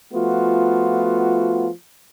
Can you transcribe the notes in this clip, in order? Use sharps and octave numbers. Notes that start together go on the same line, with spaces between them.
F3 A3 B3 F4 F#4